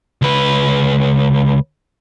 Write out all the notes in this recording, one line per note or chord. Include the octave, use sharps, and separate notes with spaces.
C#2 B4